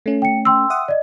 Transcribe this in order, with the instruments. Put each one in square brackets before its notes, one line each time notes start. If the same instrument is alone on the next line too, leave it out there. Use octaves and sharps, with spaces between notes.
[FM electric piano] A3 C#4
[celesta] G5 C#7
G5 C6 E6
[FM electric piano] E5 F#5 D#6
[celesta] D5 D#5